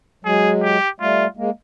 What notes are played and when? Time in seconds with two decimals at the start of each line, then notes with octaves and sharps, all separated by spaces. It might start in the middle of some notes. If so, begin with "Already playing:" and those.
0.24 F#3 G#3 G#4
0.63 G4
1.00 G3 A3 F4
1.37 G#3 A#3